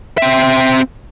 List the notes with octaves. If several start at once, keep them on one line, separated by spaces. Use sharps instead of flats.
C4 E5